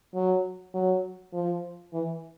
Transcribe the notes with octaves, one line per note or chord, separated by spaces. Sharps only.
F#3
F#3
F3
E3